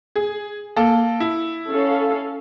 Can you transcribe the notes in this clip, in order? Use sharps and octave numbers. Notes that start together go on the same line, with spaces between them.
G#4
A#3 A4
E4
C#4 A4 F5